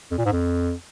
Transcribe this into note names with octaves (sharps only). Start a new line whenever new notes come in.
F2
A#2
G#2
F2